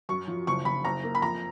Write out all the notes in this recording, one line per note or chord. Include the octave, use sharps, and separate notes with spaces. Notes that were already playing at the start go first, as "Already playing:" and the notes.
F#2 C#6
F3
F#1 C#6
F#1 B5
F#1 A#5
A#3
B5
F2 A#5